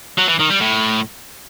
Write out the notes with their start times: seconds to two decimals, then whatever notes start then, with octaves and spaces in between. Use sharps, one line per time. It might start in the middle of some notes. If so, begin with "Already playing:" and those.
0.18 F#3
0.28 E3
0.39 D#3
0.50 G3
0.60 A2